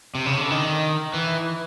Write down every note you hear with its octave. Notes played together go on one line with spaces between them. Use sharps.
C3
C#3
D3
D#3
E3